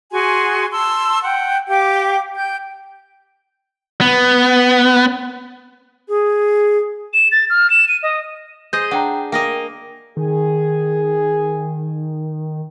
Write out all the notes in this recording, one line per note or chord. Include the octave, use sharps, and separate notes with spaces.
F#4 G#4 G#5 C6
A5 C6 E6
F#5 G5
G4 F5 G5 D6
G5 G6
B3
G#4
E7
A6
F6
E7
D#7
D#5
G#4 C5 D#5 G6
D4 F#5 G5 A#5
A#3 A#4 D#5 G5
D#3 G#4